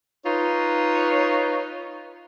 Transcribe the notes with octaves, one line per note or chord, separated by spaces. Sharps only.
D#4 F4 B4 C#5